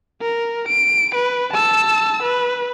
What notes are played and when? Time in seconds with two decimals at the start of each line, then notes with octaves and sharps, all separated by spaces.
0.22 A#4
0.68 D7
1.15 B4
1.54 A5 E6
2.23 B4